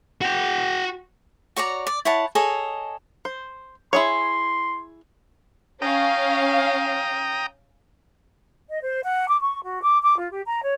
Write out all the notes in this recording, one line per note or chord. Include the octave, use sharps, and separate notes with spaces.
F#4 G5
F#4 C#5 D5 A#5
D5
E4 C#5 F#5 A5
G#4 A4 C#5 D#5
C5
E4 G#4 C#5 C6
C#4 F5 G5 A#5 D#6
D#5
C5
F#5
D6
C#6
F#4
D6
D6
F4
G4
A#5
C#5